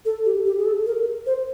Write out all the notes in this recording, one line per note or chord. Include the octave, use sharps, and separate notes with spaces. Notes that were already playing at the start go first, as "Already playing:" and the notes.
A4
G4
G4
G#4
A4
A#4
C5